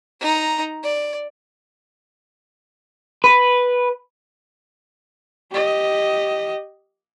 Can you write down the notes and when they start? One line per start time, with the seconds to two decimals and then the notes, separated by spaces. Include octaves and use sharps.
0.21 D#4 A#5
0.83 D5
3.24 B4
5.52 G4 D#5